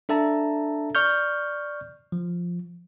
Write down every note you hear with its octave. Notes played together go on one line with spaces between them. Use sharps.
D4 A4 E5 A5 A#5
D5 C#6 F6 G6
F3